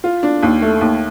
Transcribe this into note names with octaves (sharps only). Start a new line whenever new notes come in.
F4
D4
D#2
A3
D#2